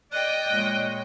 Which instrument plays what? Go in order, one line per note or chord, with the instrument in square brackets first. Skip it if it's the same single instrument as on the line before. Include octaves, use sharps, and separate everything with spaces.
[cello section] D5 [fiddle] D#5 G5 [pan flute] F#6
[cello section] A#2 G#3 C#5